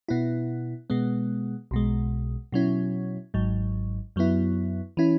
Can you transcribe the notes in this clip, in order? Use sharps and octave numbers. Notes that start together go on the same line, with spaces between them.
B2 B3 E4
B2 G#3 B3
B1 B2 G#3
B2 F#3 C#4 E4
G#1 G#2 F#3
F#2 F#3 B3 E4
E3 C#4 E4